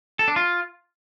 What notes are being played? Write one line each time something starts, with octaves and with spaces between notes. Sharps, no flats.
A4
D4
F4